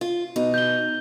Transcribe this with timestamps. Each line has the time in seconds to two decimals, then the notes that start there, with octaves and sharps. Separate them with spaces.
0.01 F4
0.36 B2 D#4
0.54 G6 G7